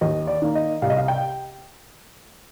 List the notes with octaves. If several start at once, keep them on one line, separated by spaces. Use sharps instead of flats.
D#2 D#5
D5
D#3 A#3
D#5
C2 F5
D#5
F5
G5